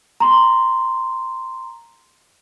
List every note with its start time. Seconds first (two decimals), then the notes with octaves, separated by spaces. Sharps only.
0.20 A#5 C6